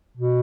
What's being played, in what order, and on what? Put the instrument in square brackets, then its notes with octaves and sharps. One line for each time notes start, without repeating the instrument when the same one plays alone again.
[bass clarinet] B2